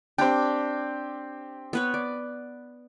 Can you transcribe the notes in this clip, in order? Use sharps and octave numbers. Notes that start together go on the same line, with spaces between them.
C4 D4 G4 G5
B3 B4 C#5
D5